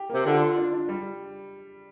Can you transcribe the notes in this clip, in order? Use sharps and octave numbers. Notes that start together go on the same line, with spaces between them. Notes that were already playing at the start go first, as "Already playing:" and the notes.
Already playing: G4
C3 A#3
D3 F4
F4
D4
D4
G3